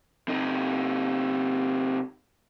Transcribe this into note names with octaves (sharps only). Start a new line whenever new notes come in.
C3 D#4